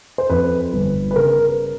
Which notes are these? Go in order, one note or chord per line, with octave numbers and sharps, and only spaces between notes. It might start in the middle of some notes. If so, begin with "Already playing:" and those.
C5
F2 B4
G1
B4
C#3 A#4